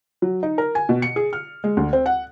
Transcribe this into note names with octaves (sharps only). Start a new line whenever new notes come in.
F#3
D#4
A#4
G#5
B2
C#7
G#4
F6
G#3
D2
C4
F#5